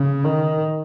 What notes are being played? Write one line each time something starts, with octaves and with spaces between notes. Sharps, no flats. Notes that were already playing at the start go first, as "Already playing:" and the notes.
Already playing: C#3
D#3